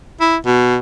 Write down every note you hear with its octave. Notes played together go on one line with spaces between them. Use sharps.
E4
B2